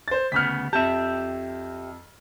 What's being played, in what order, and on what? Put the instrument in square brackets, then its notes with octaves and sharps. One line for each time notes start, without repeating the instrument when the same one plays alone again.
[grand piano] C5 A6
[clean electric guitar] D2 C#3 B3 [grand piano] F6 B6
[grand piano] F2 A5 [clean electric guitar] G4 E5